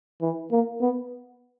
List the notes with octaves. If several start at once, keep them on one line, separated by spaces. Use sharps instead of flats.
E3
A#3
B3